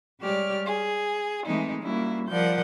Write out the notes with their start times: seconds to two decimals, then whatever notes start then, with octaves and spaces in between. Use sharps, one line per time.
0.20 G3 G#3 G4 C#5 D5 F6
0.66 G#4
1.46 E3 G#3 A3 C4 D#4
1.82 G3 A#3 C#4 E4 F#4
2.30 F3 G3 A#4 D5 F#5 G6